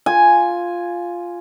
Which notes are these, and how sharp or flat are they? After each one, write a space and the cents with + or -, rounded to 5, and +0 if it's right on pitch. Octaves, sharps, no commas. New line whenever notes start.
F4 +0 G#5 +0